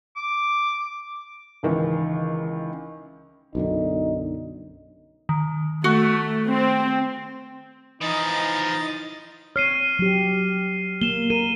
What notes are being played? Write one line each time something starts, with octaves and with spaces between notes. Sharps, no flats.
D6
C#2 D#3 E3
B1 F#2 D3 D#4
D#3
A3 F#4
C4
E3 F3 D#4 D#5 A6
C4 C#5 F6 C7 D#7
F#3 G4
A#3 E7 G7
A#4 D#7